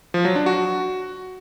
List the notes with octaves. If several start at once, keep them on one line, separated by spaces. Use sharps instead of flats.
F3
F#3
D4
F#4